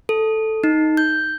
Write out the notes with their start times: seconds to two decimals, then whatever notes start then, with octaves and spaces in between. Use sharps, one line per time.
0.09 A4
0.64 D#4
0.97 G6